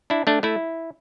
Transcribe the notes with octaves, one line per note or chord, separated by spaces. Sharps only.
D4 E4
A3 D4
A3 E4